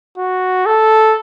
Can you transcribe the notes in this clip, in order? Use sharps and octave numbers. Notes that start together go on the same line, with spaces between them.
F#4
A4